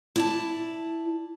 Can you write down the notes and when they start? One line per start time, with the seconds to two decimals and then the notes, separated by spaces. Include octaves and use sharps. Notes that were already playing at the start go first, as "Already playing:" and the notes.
0.16 E4 D5 A5